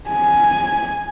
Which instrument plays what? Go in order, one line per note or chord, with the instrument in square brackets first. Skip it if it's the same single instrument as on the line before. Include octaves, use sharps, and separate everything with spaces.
[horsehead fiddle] G#5